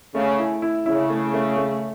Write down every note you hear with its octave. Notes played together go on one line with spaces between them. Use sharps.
C#3 A3
E4
E4
C#3 E4
A3
A3
A3